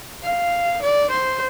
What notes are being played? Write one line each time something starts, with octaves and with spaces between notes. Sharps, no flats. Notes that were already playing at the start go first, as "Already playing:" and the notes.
F5
D5
C5